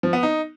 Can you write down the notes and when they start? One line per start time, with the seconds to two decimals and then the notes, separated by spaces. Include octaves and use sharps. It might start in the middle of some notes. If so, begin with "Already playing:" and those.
0.03 F3
0.13 B3
0.23 D#4